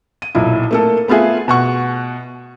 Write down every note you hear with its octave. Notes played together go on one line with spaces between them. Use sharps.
D#7
B1 A#2 E4
A3 A#3 A4
A3 B3 F4 G#4 E5
B2 F#5 C#6